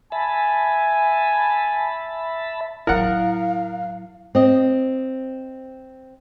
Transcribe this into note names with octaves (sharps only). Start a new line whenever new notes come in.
E5 G#5 A5 B5
A2 F#3 E4 A#4 F5 F#5
C4 D#5